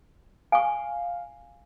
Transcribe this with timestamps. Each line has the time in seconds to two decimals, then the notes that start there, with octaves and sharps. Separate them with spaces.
0.52 F5 G#5 C#6